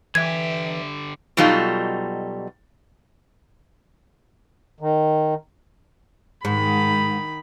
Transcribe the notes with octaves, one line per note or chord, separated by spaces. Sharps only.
D3 E3 G4 E5 G#6
B2 F#3 G3 D#4 F4 A4
D#3
G#2 D#3 B5